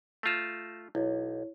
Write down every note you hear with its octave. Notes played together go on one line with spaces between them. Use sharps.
A3 F4 G6 A#6 E7
B1 E4 C#5